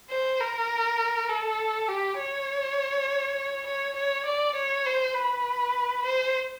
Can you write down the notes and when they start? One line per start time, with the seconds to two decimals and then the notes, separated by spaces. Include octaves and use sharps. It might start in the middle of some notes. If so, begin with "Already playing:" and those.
0.10 C5
0.40 A#4
1.29 A4
1.88 G4
2.18 C#5
3.66 C#5
3.96 C#5
4.26 D5
4.55 C#5
4.86 C5
5.15 B4
6.05 C5